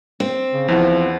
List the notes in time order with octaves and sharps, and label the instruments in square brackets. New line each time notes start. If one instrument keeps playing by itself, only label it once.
[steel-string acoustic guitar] C4
[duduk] C#3
[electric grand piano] E2 E4 F#5 [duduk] F3